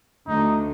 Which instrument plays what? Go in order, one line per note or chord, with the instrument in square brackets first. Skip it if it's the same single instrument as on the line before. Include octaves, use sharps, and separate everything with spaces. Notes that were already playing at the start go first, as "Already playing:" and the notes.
[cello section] D2 D3 [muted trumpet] D#4